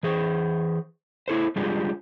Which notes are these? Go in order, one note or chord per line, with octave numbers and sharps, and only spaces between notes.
E3 G#4 C5
E4 A4 C5
G3 G#3 D4 F4 G4 G#4